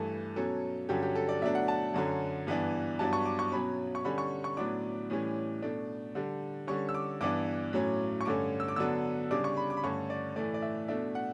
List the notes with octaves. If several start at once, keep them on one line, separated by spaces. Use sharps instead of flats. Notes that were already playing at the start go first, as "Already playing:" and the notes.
Already playing: G2 E3 A3 A4
B2 F#3 C#4 A4
G2 D3 F#3 C#4 G4
G4
A4
D5
B2 F#3 A3 D4 E5
F#5
A5
F#2 D3 F#3 C#4
G2 E3 B3 D4
G2 F#3 B3 D4 A5
C#6
D6
C#6
B2 F#3 C#4 B5
C#6
D3 G3 C#4 B5
C#6
C#6
A2 F#3 B3 D4 D6
A2 E3 G3 C#4
B2 A3 D4
D3 G3 D4
D3 G3 C#4 C#6
E6
D6
G2 E3 B3 D4 D6
A2 F#3 C#4
C#6
G2 D3 A3 C#4 D6
E6
D6
D3 F#3 B3 D4 E6
C#3 G3 D4 D6
C#6
B5
D6
B5
G2 D3 A3 C#4 C#6
D5
A2 E3 A3 D5
D5
E5
B2 A3 D4 E5
F#5